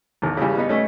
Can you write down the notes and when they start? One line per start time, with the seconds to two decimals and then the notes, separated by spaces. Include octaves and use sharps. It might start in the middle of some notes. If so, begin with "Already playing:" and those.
0.22 G#1 E2
0.37 C#3 E3 G3
0.57 B3 D#4
0.69 A3 C#4